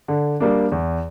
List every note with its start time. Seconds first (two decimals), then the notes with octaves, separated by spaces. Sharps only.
0.08 D3
0.40 G3 A#3 D4
0.72 E2